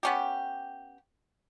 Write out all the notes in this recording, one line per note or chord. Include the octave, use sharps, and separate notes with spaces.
B3 C#4 G4